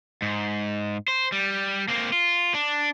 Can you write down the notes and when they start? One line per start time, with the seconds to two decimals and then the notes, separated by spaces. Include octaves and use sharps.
0.22 G#2
1.08 C5
1.32 G3
1.88 A#3 C4
2.12 F4
2.54 D4